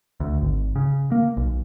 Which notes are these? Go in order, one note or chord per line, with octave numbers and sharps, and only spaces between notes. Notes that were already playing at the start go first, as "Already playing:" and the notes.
D2
G#1
C#3
A#3
B1